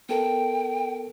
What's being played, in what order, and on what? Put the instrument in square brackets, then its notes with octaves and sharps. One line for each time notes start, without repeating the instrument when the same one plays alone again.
[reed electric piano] B3 A4 A#4 [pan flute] G5